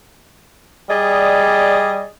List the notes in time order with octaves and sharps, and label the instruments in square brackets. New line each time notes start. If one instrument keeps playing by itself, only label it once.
[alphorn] G3 [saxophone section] G#4 D5 D#5